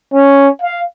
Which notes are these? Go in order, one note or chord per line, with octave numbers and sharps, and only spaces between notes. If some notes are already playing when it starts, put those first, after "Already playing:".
C#4
F5